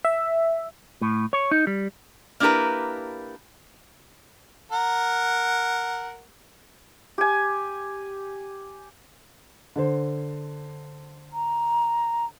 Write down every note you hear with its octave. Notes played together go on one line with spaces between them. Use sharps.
E5
A2
C#5
D#4
G3
A#3 D4 E4 G4 A#4 B4
A#4 F#5
G4 G#5
D3 C5
A#5